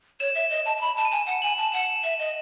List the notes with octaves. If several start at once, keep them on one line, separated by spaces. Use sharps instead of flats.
C#5 E7
E5
D#5
A5
A5
B5
A5
D#7
G#5 E7
F#5
G#5 F#7
A5
F#5 E7
E5
D#5